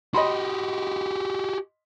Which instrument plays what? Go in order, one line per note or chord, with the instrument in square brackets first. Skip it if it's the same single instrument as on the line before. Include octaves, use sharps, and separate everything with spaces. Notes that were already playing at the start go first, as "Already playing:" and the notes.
[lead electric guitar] F#4 G4 [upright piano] D#5 B5 C6